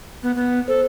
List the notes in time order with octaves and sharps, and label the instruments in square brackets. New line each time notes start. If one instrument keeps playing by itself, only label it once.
[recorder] B3
B3
[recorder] A4 [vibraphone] C5